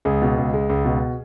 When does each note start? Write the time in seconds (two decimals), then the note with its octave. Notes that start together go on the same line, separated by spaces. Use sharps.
0.05 C#2 G#4
0.22 B2
0.38 C#2
0.54 G#3
0.69 C#2
0.85 B2